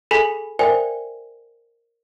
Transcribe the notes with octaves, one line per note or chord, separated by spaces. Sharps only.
G#4 A4 G#5 B5 B6 F#7
A#4 C5 D5 E5 G5 G#5